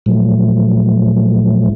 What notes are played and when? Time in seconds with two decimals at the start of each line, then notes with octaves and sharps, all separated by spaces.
0.06 A#2 F3 F#3 A3